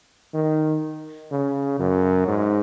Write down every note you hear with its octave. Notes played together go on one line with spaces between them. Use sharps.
D#3
C#3
F#2
G#2